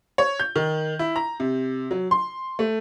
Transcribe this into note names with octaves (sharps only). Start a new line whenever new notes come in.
C#5
G6
D#3
E4
A#5
C3
F#3
C6
A3